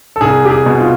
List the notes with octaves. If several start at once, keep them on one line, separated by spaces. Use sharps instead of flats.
A4
C2 G#4
G4
G#4
B2
F4